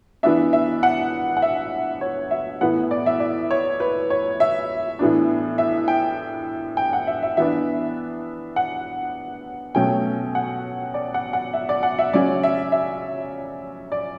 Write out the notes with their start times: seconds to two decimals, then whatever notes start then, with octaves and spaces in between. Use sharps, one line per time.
0.23 E3 B3 D4 E5
0.53 E5
0.83 F#5
1.37 F#5
1.42 E5
2.01 C#5
2.31 E5
2.61 A2 E3 B3 F#5
2.91 D5
3.06 E5
3.20 D5
3.51 C#5
3.80 B4
4.10 C#5
4.40 E5
4.99 A2 E3 B3 D4
5.58 E5
5.88 G5
6.77 G5
6.93 F#5
7.07 E5
7.23 E5
7.37 E3 B3 D4 E5
8.56 F#5
9.75 B2 F#3 A3 C#4 G5
10.35 F#5
10.94 D5
11.14 F#5
11.33 F#5
11.53 E5
11.69 D5
11.83 F#5
11.99 E5
12.13 C#3 F#3 C#4 D5
12.43 E5
12.72 E5
13.92 D5